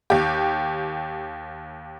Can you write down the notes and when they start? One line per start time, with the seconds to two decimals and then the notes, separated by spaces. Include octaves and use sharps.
0.10 D#2 G4